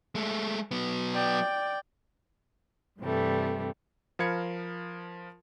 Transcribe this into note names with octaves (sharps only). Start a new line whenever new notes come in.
G#3 A3
F#3 B3
D5 G5
G2 C3 E3 G3 A3
F3 A#4 F5 B5 G#6 C#7